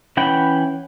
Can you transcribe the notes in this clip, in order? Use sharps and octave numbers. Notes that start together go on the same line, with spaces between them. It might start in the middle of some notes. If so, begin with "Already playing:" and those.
E3 C#4 F#5 G5 B5